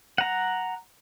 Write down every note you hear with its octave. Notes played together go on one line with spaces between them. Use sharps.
F#5 A#5